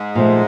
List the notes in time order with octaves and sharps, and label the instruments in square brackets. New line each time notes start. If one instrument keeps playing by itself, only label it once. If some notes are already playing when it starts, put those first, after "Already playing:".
Already playing: [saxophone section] G#2 G#3
[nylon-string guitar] A#2 F3 A3